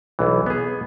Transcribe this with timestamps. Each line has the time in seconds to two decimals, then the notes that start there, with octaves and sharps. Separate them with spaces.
0.19 B1 E3
0.46 B3 G#4